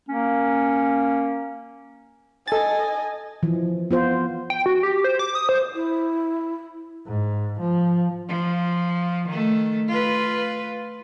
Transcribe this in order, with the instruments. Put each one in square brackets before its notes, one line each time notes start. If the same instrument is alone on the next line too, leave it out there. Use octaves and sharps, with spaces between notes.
[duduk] A#3 [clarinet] C#4
[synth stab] A4 A6 [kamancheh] D#5 G#5
[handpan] E3 F3
B3 F4 C5
[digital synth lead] G5
F#4
G4
C5
D6
D#6
C5
[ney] E4
[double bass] G#2
F3
[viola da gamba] F3
D#3 A3
F4 B4